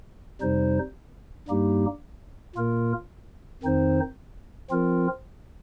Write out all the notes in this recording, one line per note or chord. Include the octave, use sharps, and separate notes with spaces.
F2 C3 G3 D#4 C5
G2 G3 A#3 D#4 G4
A#2 A#3 F4 A#4
F2 D#3 C4 D#4 C5
F3 C4 F4 A#4